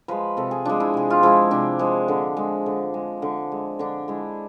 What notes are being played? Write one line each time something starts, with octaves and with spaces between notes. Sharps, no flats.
F3 G#3 B4
C3 A4
G#4
F3 G#3 D4
E4
C3 G#4
F4
F3 G#3 E4
C3 D4
F3 G#3
D3
G#3
D3
G#3
D3
G#3
D3 D4
G#3 E4